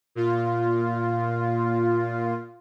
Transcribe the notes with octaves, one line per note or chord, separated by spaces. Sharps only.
A#2 F4